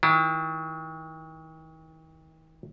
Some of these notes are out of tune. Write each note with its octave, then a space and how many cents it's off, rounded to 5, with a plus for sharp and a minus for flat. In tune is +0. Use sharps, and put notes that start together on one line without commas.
D#3 +40 E4 +35